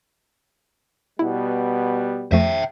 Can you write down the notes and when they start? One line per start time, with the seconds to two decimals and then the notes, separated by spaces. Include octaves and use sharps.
1.19 B2 G3 B3 E4
2.32 F2 F3 A3 E5 G5